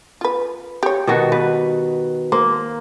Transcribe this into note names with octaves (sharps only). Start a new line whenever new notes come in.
F4 B4
G4 C#5
B2 D#3 F#4
G3 B4
A#3 C5